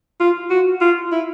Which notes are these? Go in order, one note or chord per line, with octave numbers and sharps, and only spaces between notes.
F4
F#4
F4
E4